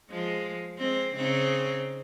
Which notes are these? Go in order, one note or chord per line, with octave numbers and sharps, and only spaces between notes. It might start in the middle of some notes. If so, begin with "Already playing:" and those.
F3 G#3
G#3 C4
C#3 C4 D#4